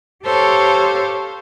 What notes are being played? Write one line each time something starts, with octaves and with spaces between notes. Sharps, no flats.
G4 A4 C5 C#5 F5